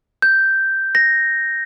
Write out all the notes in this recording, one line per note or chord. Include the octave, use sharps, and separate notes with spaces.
G6
A#6